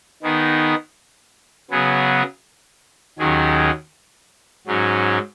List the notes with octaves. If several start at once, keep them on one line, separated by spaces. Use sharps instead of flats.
D#3 B3 D#4 G#4
C#3 F#3 B3 G#4
D#2 D#3 F#3 C#4 G#4
G#2 F#3 C#4